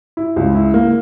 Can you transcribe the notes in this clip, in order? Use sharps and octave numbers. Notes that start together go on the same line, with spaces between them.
E4
C#2
E4
A#3